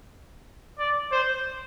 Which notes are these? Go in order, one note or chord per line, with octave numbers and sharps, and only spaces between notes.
D5
C5